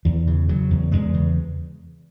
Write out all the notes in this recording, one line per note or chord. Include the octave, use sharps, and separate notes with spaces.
E2 E3
C#3
C#3 F#3
E2
E2 G#3
C#3